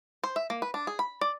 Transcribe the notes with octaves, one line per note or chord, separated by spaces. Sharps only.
C5
E5
A#3
B4
D4
G#4
B5
D5